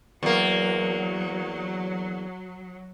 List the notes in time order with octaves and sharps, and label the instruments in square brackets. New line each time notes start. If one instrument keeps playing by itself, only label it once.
[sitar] E2 A#3 [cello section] F#3